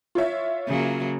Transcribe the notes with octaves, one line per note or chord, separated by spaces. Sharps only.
F4 C#5 E5
C#3 F#3 A#3